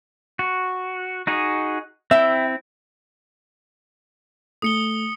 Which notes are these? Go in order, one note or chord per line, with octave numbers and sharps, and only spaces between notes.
F#4
D#4 F#4 G#4
C4 E4 E5 G5
A3 D#6 C#7 G7